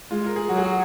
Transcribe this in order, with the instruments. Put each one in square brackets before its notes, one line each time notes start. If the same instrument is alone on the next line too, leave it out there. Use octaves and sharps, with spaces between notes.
[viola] G#3 [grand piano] F4
[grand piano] A#4
G#4
[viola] F#3 [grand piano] F#4
[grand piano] G#4
F#4